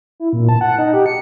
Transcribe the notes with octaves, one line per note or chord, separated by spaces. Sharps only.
E4
A#2
A5
F#5
D#4
G4
C#7